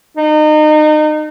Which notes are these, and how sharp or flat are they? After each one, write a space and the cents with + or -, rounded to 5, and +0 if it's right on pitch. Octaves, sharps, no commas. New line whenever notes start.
D#4 -30